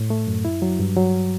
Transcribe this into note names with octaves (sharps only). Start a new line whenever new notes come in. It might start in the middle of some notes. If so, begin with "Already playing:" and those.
Already playing: A2
A3
F#2
E4
F#3
G2
F#3